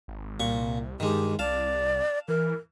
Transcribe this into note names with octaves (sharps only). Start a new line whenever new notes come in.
G#1
C2 A#2 C#6
G2 D#3 G#3 G4
C2 D5 F5 A5
E3 A#4